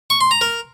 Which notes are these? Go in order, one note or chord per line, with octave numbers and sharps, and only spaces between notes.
C#6
C6
A#5
A#4